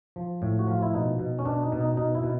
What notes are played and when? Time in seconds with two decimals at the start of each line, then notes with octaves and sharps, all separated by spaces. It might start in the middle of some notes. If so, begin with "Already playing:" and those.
0.16 F3
0.42 A2
0.59 F#4
0.68 F3 F4
0.82 E4
0.93 B2 D#4
1.19 B2
1.39 C#4
1.45 B2 D4
1.62 D#4
1.72 B2
1.81 D#4
1.97 B2 D#4
2.15 E4
2.23 B2